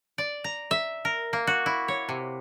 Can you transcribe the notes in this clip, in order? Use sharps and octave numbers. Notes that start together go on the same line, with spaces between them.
D5
A#5
E5
A#4
A#3
F#4
E4
C#5
C3